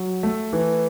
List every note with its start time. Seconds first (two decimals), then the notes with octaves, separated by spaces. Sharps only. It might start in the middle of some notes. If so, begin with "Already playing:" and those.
Already playing: F#3
0.23 A3
0.53 E3